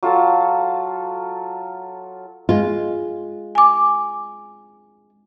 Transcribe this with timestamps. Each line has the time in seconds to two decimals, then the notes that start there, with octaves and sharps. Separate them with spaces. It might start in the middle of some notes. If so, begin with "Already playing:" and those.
0.03 F#3 F4 A4 A5
2.49 G#3 F4
3.55 G#5 D6